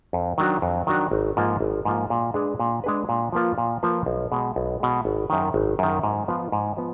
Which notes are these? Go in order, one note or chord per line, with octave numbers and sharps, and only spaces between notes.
F2
D#3 F#3 D4 F#4
F2
D#3 F#3 D4 F#4
G#1
G#2 F3 A#3 F4
G#1
G#2 F3 A#3 F4
A#2
G#3 D4 G#4 B4
A#2
G#3 D4 G#4 B4
A#2
F3 A#3 F4 B4
A#2
F3 A#3 F4 B4
B1
B2 G#3
B1
B2 G#3
G#1
F#2 D#3
G#1
F#2 D#3
G#2
F3 B3 F4
G#2
F3 B3